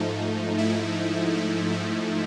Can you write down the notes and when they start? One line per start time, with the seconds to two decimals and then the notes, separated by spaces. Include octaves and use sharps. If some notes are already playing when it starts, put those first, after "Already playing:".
Already playing: G#2 F3 A3 D#4
0.58 E4
1.35 D#4
1.72 E4